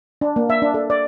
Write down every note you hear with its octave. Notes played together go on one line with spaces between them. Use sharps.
D4
A#3
E5
D4
A4
D5